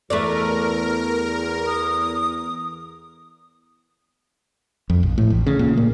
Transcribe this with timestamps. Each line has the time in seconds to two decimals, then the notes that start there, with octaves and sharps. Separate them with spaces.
0.10 E2 A3 A#4 B4 D5
1.67 D#6
4.90 F2
5.03 A#1
5.18 A2
5.30 A1
5.47 C#3
5.59 A#2
5.77 A#3